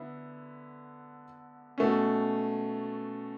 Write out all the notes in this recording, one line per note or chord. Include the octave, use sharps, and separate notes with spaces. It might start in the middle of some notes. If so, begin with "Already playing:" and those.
Already playing: D3 B3 E4
B2 A3 C#4